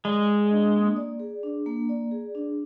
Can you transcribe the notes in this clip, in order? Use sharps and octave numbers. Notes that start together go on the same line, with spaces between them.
G#3 D5
G#4
D4
A#3
D5
G#4
D4
A#3
D5
G#4
D4